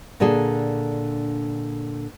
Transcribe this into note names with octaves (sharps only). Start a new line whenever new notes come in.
A#2 D3 D4 G#4 A4